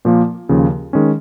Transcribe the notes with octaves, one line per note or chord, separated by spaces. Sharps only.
A#2 F3 A#3
D#2 C#3 F3
D#3 G#3 C#4